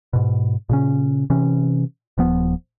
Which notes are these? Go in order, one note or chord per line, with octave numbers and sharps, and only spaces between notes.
G#2 B2
A#2 C#3 C#4
C3 E3 C#4
D#1 F3 B3